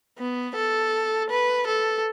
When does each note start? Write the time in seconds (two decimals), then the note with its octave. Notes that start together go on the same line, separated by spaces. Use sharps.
0.18 B3
0.55 A4
1.30 B4
1.67 A4